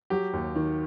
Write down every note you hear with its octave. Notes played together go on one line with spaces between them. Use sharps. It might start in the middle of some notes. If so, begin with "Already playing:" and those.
F#3 G4
D#2
D#3